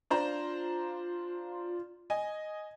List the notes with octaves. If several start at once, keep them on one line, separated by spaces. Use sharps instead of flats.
D4 F4 C5 A#5
D#5 G#5